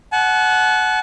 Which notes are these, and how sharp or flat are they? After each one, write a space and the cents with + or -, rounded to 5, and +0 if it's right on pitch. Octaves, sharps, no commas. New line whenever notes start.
F#5 +0 A5 -40